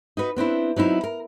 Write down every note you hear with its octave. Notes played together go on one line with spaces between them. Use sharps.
D#4 F#4 B4
B3 C4 D4 E4
F#3 C4 D#4 E4
A#4